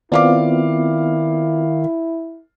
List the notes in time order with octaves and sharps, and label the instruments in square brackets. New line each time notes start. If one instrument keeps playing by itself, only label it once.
[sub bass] D#3 [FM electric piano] B3 C4 F4 [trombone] E4 [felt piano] D5 F5 D6